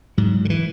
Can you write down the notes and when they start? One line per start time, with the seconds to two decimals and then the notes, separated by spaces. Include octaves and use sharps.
0.18 G#2 F#3
0.45 D3
0.50 E3